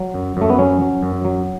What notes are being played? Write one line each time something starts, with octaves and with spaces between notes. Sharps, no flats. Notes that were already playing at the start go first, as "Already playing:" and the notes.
Already playing: F#3
F#2
F#2 A3
B3
F#3 C#4
F#3
F#2
F#3